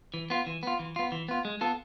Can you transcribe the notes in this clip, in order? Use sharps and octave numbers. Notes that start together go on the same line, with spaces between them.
E3
B3 F4
E3
B3 F4
E3
B3 F4
E3
B3 F4
G#3
B3 F4 A4